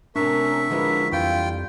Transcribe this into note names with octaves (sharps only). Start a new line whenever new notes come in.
A2 C3 C#4 D4 A#4 E5 C#6
D3 F3 G#3 E4 A#4 B4
F2 E3 G3 F4 G5